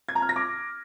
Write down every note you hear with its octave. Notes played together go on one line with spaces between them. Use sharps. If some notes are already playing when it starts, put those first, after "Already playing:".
G#6
A#5
F6
A#6
D6